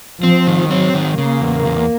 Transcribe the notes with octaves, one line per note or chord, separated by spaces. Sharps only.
F3 C4
D#3
F#3 C4
D#3
C#3 A#3
E2
E2